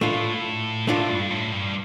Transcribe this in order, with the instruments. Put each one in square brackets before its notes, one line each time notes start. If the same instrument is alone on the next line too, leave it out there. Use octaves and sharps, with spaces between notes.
[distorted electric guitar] A2 [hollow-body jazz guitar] A3 D4 F4
[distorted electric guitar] A2 [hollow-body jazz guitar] A3 D4 F4
[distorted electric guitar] G2
A2
G2